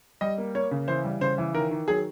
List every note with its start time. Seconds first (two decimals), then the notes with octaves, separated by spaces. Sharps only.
0.21 G3 D#5
0.38 A#3
0.55 A#3 C#5
0.71 C#3
0.88 E3 C5
1.04 G3
1.21 C#3 C5
1.38 E3
1.55 D#3 A#4
1.71 D#3
1.88 F#3 G#4